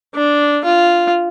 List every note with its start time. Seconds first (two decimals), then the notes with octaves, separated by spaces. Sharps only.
0.15 D4
0.65 F4